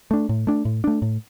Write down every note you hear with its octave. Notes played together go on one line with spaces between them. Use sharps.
A3 D4
A2
A3 D4
A2
A3 D4
A2